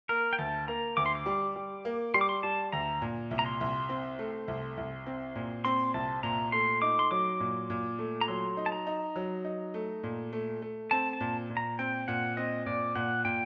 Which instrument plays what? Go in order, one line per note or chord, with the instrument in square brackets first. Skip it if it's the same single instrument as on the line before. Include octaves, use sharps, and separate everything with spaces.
[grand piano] A#3 [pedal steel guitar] A#4
[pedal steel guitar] G5
[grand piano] D2 [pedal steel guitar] A5
[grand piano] A#3 [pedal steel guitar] A#5
[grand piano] D2 [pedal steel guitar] D6
[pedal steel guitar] C6
D6
[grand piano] G3
G3
A#3
[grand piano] G3 [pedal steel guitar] C6
[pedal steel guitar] D6
C6
[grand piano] G3 [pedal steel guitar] A5
[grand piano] D2 [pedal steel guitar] A#5
[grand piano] A#2
C2
[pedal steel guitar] A#5
C6
[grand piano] C2
C4
A3
C2
C2
C4
A#2
[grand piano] C4 [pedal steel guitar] C6
[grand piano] C2 [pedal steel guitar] A5
[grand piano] A#2 [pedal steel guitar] A#5
[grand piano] A3 [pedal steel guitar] C6
[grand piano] D#4 [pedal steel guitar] D6
[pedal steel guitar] C6
[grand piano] F#3 [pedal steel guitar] D6
[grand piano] A#2
A#2
A3
[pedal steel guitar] A#5
[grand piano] F#3 [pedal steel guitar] C6
[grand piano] D#4
[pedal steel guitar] A5
A#5
[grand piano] D#4
F#3
D#4
A3
A#2
A3
A3
[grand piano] C4 [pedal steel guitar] A5
[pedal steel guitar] A5
[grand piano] A#2
A#2
[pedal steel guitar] A#5
[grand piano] C4 [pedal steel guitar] G5
[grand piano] A#2 [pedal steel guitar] F#5
[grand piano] C4 [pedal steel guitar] D#5
[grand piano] A#2 [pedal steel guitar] D5
[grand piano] A#2 [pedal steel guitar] F#5
[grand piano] A#2 [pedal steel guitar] G5